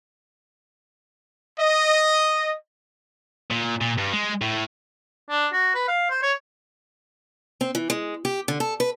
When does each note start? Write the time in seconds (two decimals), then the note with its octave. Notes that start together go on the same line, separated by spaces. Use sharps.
1.58 D#5
3.50 A#2
3.81 A#2
3.98 G2
4.13 G#3
4.41 A2
5.30 D4
5.53 F#4
5.75 B4
5.88 F5
6.10 C5
6.23 C#5
7.61 C4
7.75 E3
7.90 G#3
8.25 G4
8.48 D3
8.60 A4
8.80 B4